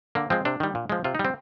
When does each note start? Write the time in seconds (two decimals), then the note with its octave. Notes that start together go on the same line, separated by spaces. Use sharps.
0.15 D3 A#3
0.30 F3 G#3 C4
0.45 C3 D4
0.60 D#3 G3
0.75 A#2
0.90 F3 G#3
1.04 C3 F4
1.15 D#4
1.19 G3
1.25 C4